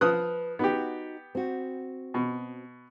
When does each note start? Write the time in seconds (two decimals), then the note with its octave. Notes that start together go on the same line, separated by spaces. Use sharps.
0.01 F3 B4 D#6 F#6
0.59 B3 D#4 F#4 G4
1.35 C4 F#4
2.14 B2